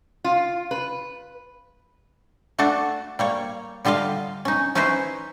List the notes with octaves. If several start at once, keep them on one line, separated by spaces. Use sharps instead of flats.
F4
B4
A3 D4 F#4 A4
G3 A#3 C#5
D3 G3 F4 D#5 F5
C#4 D#4
C#4 D#4 E4 B4 C5 D#5